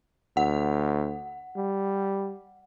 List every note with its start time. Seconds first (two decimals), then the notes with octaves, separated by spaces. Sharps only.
0.37 D2 F#5
1.57 G3